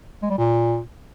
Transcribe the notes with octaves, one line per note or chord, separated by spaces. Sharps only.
G#3
G3
A#2